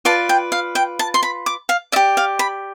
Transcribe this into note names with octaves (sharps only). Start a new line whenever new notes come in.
F4 B4 D5 A5
G5
F5
G5
A5
C6
B5
D6
F5
G4 D5 E5
F5
B5